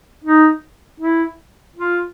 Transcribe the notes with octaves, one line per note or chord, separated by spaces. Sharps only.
D#4
E4
F4